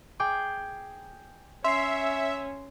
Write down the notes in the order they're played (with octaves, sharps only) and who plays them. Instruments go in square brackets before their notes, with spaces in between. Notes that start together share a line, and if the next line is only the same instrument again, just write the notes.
[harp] G#4 G5 D6
[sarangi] C#4 [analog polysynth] E5 [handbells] C6 C7